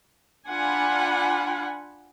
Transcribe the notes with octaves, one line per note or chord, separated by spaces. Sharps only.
D4 F4 F#5 G#5 B5